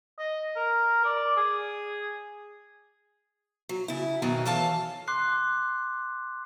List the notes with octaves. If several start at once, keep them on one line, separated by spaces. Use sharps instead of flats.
D#5
A#4
D5
G#4
F#3
C#3 E4
F#2 B2 D#3 F#3
E3 A4 C#5 F5 A5
C6 D6 F#6 C7